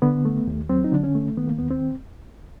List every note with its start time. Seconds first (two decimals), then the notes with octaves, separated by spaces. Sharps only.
0.02 D3 B3
0.25 A3
0.47 D#2
0.69 F#3 C4
0.84 D#4
0.92 D3 D4
1.04 C#4
1.15 A3
1.37 D#3 B3
1.48 A#3
1.58 D#2 B3
1.71 C4